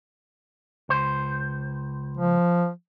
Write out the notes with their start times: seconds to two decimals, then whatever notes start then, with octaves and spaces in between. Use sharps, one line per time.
0.89 C#2 C5
2.17 F3